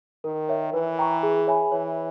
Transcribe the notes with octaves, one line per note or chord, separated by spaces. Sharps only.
D#3 A#4
C#5 E5
E3 B4
G5 A#5 C#6
G#4
C#5 E5 G#5 B5
E3 C#5